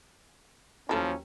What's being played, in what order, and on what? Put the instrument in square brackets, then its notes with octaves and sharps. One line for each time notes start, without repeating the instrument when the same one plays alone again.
[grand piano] D#2 F#3 A#5 [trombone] F3 [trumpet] C#4 [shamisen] E4 A4